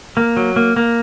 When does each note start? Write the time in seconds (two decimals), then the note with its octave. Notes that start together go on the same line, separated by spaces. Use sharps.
0.17 A#3
0.37 F#3
0.56 A#3
0.76 A#3